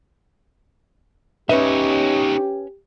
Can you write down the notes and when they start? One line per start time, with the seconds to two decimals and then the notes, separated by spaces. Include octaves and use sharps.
1.49 C#4 D#4 G4 B4 C#5 E5